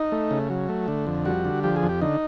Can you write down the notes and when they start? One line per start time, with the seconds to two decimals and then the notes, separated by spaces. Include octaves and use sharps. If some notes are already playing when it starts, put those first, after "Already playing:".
Already playing: D#4
0.12 A3
0.31 C#3
0.50 F#3
0.69 A3
0.88 D3
1.07 F2
1.25 G3 F#4
1.45 D3
1.63 F3 G4
1.76 G#4
1.83 F2
1.89 G4
2.01 D3 D#4